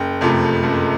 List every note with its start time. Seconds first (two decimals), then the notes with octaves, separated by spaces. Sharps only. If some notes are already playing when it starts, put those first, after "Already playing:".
Already playing: F#1 G5
0.21 F2 C3 F3 A3
0.64 F#1